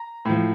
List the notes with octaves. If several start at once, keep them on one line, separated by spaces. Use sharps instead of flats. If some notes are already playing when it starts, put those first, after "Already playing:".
Already playing: A#5
A2 F3